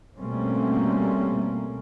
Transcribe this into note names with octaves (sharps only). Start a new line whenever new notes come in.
B2 G3 A3 A#3 C4 C#4